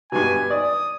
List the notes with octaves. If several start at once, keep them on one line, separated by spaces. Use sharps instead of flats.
G2 B2 G#5
D5 D#6